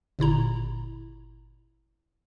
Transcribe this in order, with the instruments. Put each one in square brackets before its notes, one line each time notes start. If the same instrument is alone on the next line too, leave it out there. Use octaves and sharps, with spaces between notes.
[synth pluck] G1 A#2 E4 A#5